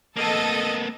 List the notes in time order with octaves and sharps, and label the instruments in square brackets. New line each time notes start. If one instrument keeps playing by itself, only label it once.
[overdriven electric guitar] A#3 B3 [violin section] A4 D#5 A5